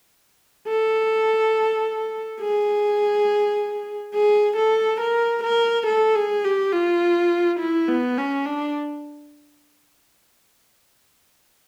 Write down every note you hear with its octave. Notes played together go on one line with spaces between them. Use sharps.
A4
G#4
G#4
A4
A#4
A#4
A4
G#4
G4
F4
E4
B3
C#4
D4